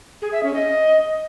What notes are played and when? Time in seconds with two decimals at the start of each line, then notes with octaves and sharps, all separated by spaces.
0.22 G#4
0.32 E5
0.43 C#4
0.54 D#5